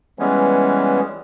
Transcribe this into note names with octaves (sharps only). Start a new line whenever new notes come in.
E3 G3 G#3 B3 C#4